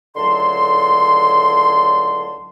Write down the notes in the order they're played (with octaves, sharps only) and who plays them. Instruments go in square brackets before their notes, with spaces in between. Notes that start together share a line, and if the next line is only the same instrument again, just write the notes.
[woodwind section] C#2 A2 D3 F#3 A5 C6